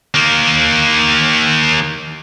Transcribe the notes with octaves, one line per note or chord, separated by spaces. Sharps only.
D#3 A#3